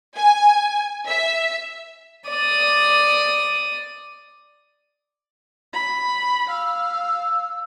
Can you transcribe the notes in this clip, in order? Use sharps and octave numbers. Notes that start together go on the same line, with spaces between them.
G#5
E5
D5 D#6
B5
F5 E6